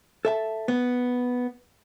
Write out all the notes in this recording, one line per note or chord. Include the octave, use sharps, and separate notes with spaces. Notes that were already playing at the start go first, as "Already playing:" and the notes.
A4 E5 A5
B3